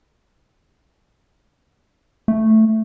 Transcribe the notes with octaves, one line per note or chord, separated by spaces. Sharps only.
A3